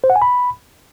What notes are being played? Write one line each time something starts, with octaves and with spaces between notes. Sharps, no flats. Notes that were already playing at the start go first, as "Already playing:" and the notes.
C5
F#5
G#5
B5